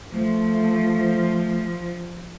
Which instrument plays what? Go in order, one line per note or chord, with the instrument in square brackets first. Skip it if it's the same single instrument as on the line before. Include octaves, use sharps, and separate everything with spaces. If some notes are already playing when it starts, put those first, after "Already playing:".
[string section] F3 [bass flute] A3